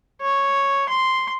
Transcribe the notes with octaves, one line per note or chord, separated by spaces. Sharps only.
C#5
C6